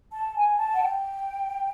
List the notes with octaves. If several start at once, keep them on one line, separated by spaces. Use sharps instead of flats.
A5
G#5
A5
F#5
G5